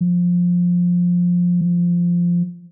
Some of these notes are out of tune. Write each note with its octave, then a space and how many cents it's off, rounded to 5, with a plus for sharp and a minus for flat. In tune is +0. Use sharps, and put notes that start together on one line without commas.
F3 +15
F3 -5